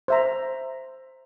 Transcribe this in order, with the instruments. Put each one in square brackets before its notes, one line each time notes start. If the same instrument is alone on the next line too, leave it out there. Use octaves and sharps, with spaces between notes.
[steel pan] C5 E5 A#5